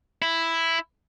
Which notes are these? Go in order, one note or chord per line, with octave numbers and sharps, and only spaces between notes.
E4